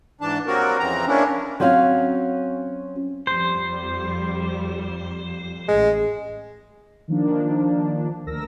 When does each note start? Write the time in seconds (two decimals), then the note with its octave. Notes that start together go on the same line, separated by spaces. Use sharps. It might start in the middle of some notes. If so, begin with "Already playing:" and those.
0.21 G#2 E3 D4 A5
0.47 F#3 G3 A#3 C4 F#4 A#4
0.79 F2 C#3 E3 C4 A#5
1.08 A#3 C#4 D4 E4
1.60 F#3 C4 C#4 F#4 F5
3.27 F2 G3 C5
5.68 A1 G#3
7.08 D#3 F3 A#3 D4
8.26 D2 A#4 E6 A#6